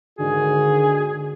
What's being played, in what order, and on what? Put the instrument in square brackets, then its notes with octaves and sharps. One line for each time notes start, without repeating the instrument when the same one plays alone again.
[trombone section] G#2 D#3 F#4 [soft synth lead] D3 [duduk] G#4